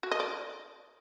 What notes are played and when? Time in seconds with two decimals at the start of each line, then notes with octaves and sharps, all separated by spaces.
0.03 F#4
0.11 D#5
0.20 D5